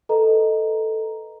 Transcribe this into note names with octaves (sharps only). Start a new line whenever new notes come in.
A4 B4 D#5 A#5